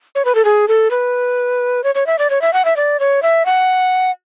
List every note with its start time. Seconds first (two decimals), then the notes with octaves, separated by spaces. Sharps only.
0.15 C#5
0.25 B4
0.35 A4
0.45 G#4
0.68 A4
0.91 B4
1.84 C#5
1.95 C#5
2.07 E5
2.19 D5
2.30 C#5
2.42 E5
2.53 F#5
2.65 E5
2.77 D5
3.00 C#5
3.23 E5
3.46 F#5